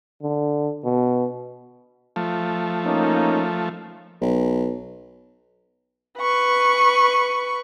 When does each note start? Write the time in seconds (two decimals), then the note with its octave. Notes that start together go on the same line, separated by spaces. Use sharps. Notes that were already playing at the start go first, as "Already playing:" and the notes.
0.22 D3
0.84 B2
2.16 F3 A3
2.86 A#3 C#4 D#4
4.21 B1
6.18 B4 C#6